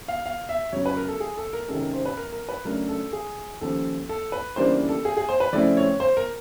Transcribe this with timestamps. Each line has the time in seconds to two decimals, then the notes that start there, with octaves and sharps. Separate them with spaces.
0.08 F5
0.26 F5
0.49 E5
0.73 F#2 C#3 F#3 C#5
0.86 B4
0.97 A#4
1.08 A4
1.20 G#4
1.37 A4
1.53 A#4
1.68 C3 D#3 G#3 C#4 A4
1.81 A#4
1.93 C5
2.06 B4
2.17 A#4
2.32 A#4
2.49 B4
2.65 C#3 F#3 A3 D4 A#4
2.89 A4
3.13 G#4
3.61 D#2 C#3 F3 A4
4.09 A4
4.32 B4
4.56 C#3 E3 G3 A#3 D4 C5
4.89 A4
5.05 G#4
5.17 G#4
5.29 C5
5.40 B4
5.53 C#3 F3 A3 C4 E4 D5
5.77 C#5
6.00 C5
6.17 A#4